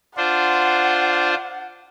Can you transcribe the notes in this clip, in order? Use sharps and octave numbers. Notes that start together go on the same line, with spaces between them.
D4 F4 C5 F#5